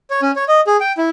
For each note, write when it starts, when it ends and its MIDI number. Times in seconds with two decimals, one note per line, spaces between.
0.10 0.21 73
0.22 0.31 61
0.36 0.44 73
0.48 0.61 75
0.67 0.77 68
0.80 0.92 79
0.98 1.10 64